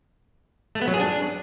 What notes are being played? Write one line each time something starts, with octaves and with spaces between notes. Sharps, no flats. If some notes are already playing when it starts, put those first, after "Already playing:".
A3
B3
F#3
G#4
D4